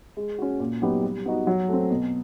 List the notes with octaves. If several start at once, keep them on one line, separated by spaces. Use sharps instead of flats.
G#3
C#4 F#4
A#2
F#3 B3 D#4 G4
G3
B3 D#4 F#4
F#3
A3 C4
B2